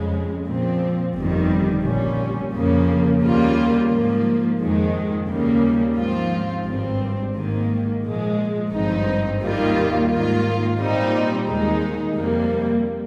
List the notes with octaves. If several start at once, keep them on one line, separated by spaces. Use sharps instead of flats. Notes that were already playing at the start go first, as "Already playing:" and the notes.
Already playing: F2 C#3 G#3
A#2 F3 C4
G1 F2 D#3 G3
A#1 A#2 G3 C#4
F2 C#3 F3 A#3
D#2 C#3 G3 A#3 F4
G#2 F3 A#3
F2 D#3 G#3
D#2 C#3 G3 A#3
G#2 F3 C4 F4
G#1 G2 G3 C4
G#2 D#3 A#3
A#2 F3 G#3
G#1 G2 F3 C4 D#4
D#2 D#3 G3 A#3 F4
G#2 D#3 A#3 F4
A#2 G3 C4 D#4
D#2 D#3 G#3 D#4
F2 C3 G3 A#3